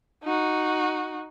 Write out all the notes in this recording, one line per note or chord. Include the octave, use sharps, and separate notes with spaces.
D#4 F#4